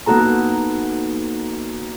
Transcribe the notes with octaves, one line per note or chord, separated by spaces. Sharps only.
A#3 B3 D#4 F#4 A4 A#5